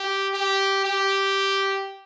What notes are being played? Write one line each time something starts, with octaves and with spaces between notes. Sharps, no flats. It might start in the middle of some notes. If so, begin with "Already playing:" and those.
Already playing: G4
G4
G4